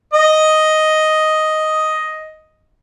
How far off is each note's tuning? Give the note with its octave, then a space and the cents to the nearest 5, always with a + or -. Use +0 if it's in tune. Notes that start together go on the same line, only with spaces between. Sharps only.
D#5 +5